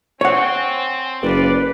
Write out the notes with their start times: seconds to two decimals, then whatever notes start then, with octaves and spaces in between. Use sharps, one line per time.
0.21 C4 C#5 F#5 G#5
1.22 F#1 F4 B4 D5